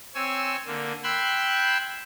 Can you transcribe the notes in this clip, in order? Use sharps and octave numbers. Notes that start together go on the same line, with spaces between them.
C4 C#5 G#5 E6
D3 A#3
G5 B5 C6 E6 F#6 G#6